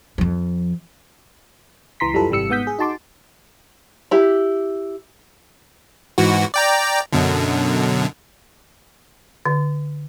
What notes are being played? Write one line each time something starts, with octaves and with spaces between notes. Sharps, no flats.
F2 F3
C#2 E3 A#5 C6 B6
F#2 G3 E4 F4 A4 B4
G#1 C3 E3 G3 E6 C#7
G#2 B3 F#5 D#6 G6 B6
G#4
D#4 F#4 A5 C6 D6
E4 G4
G#2 E3 F#4
D5 G5 A#5
F#2 B2 D3
D3